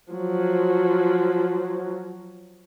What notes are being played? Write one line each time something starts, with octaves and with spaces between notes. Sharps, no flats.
F3 F#3